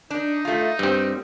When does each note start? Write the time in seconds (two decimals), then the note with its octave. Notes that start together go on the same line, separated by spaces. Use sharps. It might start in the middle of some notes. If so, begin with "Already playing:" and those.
0.10 D4 D#4
0.45 A3 F4
0.79 G2 G3 C4